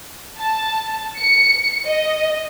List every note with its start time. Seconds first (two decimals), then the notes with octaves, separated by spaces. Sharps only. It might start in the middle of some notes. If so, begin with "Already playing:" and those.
0.39 A5
1.18 C#7
1.88 D#5